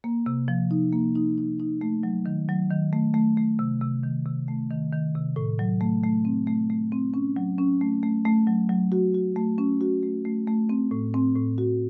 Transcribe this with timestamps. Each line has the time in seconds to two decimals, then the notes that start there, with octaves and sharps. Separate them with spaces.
0.04 A#3
0.26 C3
0.48 F3
0.71 D#4
0.92 A#3
1.15 D#4
1.38 D#4
1.60 D#4
1.81 A3
2.03 F#3
2.26 D#3
2.49 F#3
2.71 D#3
2.93 A3
3.14 A3
3.37 A3
3.59 C3
3.81 C3
4.03 D#3
4.26 C3
4.48 A3
4.71 D#3
4.93 D#3
5.15 C3
5.36 A2
5.59 F#3
5.81 A3
6.03 A3
6.25 C4
6.47 A3
6.70 A3
6.92 C4
7.14 C#4
7.36 F#3
7.58 C#4
7.81 A3
8.03 A3
8.25 A3
8.47 F#3
8.69 F#3
8.92 F#4
9.14 F#4
9.36 A3
9.58 C#4
9.81 F#4
10.03 A3
10.25 A3
10.48 A3
10.69 C4
10.91 A2
11.14 C4
11.36 A2
11.58 F#4